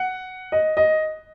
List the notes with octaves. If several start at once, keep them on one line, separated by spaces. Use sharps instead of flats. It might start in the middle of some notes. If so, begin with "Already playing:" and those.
Already playing: F#5
D#5
D#5